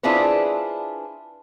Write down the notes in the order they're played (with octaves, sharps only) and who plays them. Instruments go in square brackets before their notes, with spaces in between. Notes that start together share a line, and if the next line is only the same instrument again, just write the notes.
[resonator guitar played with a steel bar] D4 E4 F4 G#4 B4 C5